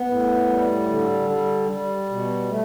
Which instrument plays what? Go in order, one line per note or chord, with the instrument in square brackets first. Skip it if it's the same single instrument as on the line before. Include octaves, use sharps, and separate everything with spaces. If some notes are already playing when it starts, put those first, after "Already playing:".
Already playing: [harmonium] B3
A2
G3
D3
G3
G3
B2
A3